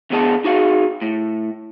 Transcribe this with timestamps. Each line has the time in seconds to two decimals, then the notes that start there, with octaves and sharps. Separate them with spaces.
0.10 E2 D3 B3 G#4 D#5 A5
0.44 D#4 F#4 G#4 F5
1.02 A2